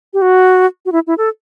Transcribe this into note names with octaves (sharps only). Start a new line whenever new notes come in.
G4
F#4
F#4
E4
E4
A4